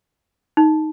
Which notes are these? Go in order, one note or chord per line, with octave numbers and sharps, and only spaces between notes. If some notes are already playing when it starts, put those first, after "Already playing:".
D#4